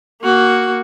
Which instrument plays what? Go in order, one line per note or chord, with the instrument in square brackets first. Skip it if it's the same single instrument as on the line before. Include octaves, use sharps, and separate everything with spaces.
[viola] A#3 F#4